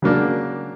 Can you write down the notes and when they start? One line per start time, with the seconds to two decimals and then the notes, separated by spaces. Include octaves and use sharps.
0.02 C#3 F#3 A#3 D4